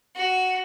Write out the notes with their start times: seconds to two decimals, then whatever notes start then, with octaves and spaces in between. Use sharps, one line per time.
0.16 F#4